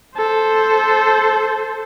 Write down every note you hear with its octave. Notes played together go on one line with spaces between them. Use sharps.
A4 C5